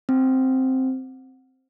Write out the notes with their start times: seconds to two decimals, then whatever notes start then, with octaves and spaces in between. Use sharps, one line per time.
0.09 C4